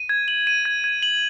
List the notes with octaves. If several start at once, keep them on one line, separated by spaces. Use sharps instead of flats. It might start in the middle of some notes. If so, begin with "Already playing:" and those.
Already playing: D#7
G#6
F#7
D#7
G#6
G#6
F#7